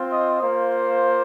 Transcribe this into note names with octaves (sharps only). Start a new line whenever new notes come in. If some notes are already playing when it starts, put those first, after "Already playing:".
Already playing: C4 F4
D#5
A#3 F4 C5